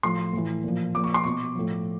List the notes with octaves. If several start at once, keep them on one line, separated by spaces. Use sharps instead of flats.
A2 F3 C6
A2 E3
A#2 F3
A#2 F3 D6
C#6
C6
B2 C#6
A2 F3